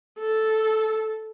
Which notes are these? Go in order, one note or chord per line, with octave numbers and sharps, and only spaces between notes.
A4